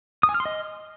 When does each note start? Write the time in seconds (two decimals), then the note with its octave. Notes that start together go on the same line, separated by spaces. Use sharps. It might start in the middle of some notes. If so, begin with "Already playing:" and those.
0.23 D#6
0.29 G#5
0.34 F6
0.40 C6
0.46 D#5